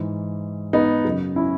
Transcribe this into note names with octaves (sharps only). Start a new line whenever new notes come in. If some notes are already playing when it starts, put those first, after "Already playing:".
Already playing: G#2 E3
B3 D#4
F#2 C#3 F#3
C#4 E4